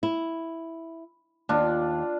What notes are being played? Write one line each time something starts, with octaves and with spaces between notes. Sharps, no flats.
E4
D#2 D4 F4